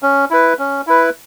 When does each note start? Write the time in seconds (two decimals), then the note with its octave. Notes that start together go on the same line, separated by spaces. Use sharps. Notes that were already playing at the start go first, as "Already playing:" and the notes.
0.03 C#4
0.31 E4 B4
0.59 C#4
0.87 E4 B4